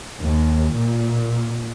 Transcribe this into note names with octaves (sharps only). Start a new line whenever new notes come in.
D#2
A#2